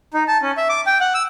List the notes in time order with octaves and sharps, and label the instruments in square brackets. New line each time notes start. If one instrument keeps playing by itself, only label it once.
[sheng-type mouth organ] D#4
A5
C#4
E5
D6
G5
F#5
E6